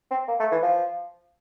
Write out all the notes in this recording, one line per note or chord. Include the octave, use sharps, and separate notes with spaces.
C4
A#3
A3
E3
F3